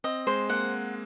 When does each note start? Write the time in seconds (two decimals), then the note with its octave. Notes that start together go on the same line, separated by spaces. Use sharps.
0.04 C4 D#5
0.27 G#3 C5
0.49 A#3 F#5